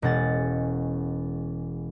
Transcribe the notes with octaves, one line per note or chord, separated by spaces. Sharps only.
E1 G#3 C#4 F#5 A6